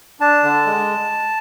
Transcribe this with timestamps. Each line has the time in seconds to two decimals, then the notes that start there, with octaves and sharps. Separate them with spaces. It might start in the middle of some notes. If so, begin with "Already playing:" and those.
0.20 D4 A5
0.43 D3
0.66 G#3